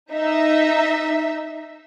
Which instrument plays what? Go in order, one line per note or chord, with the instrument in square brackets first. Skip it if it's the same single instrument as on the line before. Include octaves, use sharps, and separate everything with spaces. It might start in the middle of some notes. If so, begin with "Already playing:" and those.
[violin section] D#4 E5